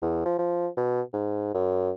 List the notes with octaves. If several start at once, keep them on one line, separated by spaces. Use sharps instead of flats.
E2
F3
F3
B2
G#2
F#2